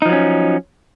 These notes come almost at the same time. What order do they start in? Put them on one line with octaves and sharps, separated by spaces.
D#4 F3 F#3 C#4